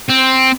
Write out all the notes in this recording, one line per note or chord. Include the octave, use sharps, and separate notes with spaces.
C4